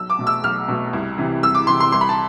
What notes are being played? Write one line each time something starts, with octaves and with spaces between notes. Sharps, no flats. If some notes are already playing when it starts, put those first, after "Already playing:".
Already playing: B1 E6
D6
B2 A3
E6
B1 F6
B2 A3
C2
C3 E3
C2 E6
D6
C3 E3 C6
C6
C2 C6
B5
A5